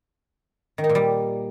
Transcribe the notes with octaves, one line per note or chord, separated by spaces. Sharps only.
D#3
D#4
A#2
G3